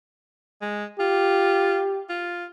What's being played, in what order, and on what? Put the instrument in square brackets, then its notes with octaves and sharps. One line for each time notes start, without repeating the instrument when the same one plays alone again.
[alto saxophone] G#3
[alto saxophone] F4 [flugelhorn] G4
[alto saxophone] F4